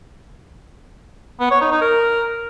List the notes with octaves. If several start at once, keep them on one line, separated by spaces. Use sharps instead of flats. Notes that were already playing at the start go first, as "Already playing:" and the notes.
B3
C#5
D#4
D#4
A#4